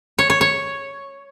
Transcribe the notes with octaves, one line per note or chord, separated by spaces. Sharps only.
C#5
C#5
C#5